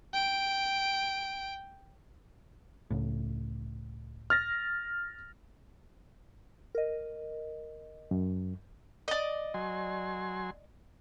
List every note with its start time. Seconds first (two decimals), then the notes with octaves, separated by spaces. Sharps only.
0.13 G5 D7
2.91 C#2 A2
4.30 F6 A6 A#6
6.75 A#4 D#5
8.11 F#2
9.08 D5 D#5
9.54 F#3 G#5 C6